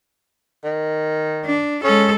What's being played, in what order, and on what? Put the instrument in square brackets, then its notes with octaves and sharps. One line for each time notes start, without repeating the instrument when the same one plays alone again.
[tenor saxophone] D#3
[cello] D4
[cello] G#3 A4 [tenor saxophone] C#4